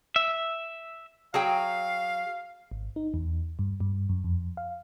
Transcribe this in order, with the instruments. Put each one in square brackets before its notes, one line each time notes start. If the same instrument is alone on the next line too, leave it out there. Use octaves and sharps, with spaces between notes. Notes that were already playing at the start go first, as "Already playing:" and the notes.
[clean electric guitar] E5
[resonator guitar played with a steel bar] F#3 G#4 G5 [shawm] F5
[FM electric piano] G#1
D#4
E2
G2
G2
F#2
F2
F5